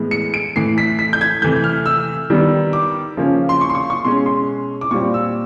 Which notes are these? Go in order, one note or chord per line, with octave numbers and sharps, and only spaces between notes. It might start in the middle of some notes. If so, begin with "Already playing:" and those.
Already playing: A2 E3 G#3 B3
C#7
D7
A2 E3 A3 C7
B6
B6
G6
G#6
C3 E3 A3 G6
F6
E6
D#3 G3 B3
D6
C#3 F3 A#3 C#4
C6
C#6
C6
C#6
C#6
B2 G#3 C#4 C6
C6
D6
A#2 G3 C4 C#6
E6